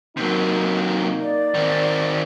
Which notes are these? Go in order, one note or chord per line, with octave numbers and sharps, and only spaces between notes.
C3 F#3 A#3 D#4
D5
D#3 C4